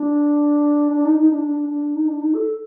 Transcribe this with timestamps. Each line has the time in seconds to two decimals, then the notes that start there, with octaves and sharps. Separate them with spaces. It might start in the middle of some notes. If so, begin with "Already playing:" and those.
Already playing: D4
0.92 D4
1.05 D#4
1.18 D#4
1.30 D4
1.43 D4
1.69 D4
1.95 D#4
2.08 D4
2.21 D#4
2.34 A4